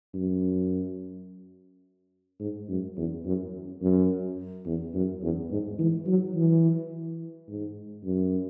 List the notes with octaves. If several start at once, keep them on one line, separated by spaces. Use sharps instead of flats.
F#2
G#2
F#2
E2
F#2
F#2
E2
F#2
E2
G#2
E3
F#3
E3
G#2
F#2